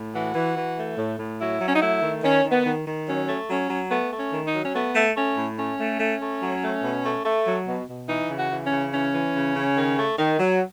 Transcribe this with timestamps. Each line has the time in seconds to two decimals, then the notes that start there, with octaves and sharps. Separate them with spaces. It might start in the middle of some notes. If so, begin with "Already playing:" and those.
Already playing: A2
0.14 E3 F#4
0.35 E3
0.56 E3
0.78 A3
0.97 A2
1.18 A2
1.40 F#3 E4
1.61 F#3
1.67 C#4
1.75 D#4
1.81 A3 E4
2.02 D#3
2.23 D#3 C#4
2.44 D#3
2.51 B3
2.66 D#3
2.87 D#3
3.07 F#3 C#4
3.28 A3
3.49 F#3 C#4
3.69 F#3
3.91 A3 B3
4.11 A3
4.19 C#4
4.32 D#3
4.46 D#4
4.53 F#3
4.63 C#4
4.75 A3 B3
4.95 A3
5.16 A3 C#4
5.38 A2
5.58 A3 C#4
5.79 A3
6.00 A3
6.21 A3
6.42 F#3
6.63 A3
6.83 B2
7.05 A3
7.25 A3
7.47 F#3
7.67 B2
7.88 B2
8.09 E3 D#4
8.30 C#3
8.37 F#4
8.51 E3
8.65 C#4
8.72 C#3
8.93 E3 C#4
9.14 E3
9.35 C#3
9.56 C#3
9.77 D#3
9.98 A3
10.18 D#3
10.39 F#3